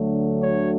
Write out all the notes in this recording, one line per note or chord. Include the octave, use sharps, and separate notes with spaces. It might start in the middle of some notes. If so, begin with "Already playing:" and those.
Already playing: D2 D3 F#3 A3
C#5